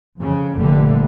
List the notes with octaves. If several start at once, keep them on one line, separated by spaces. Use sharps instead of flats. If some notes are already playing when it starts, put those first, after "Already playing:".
F2 C#3
F1 A#2 D3 G3 A3